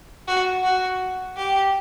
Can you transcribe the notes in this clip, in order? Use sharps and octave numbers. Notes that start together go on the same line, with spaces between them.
F#4
F#4
G4